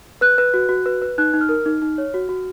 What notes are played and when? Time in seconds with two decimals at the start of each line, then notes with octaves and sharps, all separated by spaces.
0.21 B4 F#6
0.38 B4
0.54 F#4
0.69 F#4
0.86 B4
1.02 B4
1.18 D#4 F#6
1.34 D#4
1.41 F6
1.49 A#4
1.66 D#4
1.82 D#4
1.98 C#5
2.14 F#4
2.29 F#4